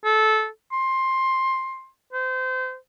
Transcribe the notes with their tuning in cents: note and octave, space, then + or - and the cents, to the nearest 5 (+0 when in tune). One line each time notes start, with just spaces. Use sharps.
A4 -20
C6 +15
C5 -30